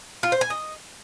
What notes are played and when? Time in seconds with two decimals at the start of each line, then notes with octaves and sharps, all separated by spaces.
0.23 F4
0.32 C5
0.41 G#5
0.50 D#5